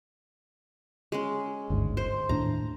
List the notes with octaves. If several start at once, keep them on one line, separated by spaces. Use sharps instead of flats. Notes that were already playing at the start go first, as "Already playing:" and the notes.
G#3 C#4
G1 D2 G#2
C5
D#2 A2 D4 A#5